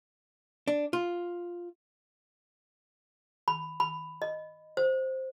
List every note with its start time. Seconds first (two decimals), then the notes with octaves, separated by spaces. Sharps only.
0.68 D4
0.93 F4
3.48 B5
3.80 B5
4.22 D#5
4.77 C5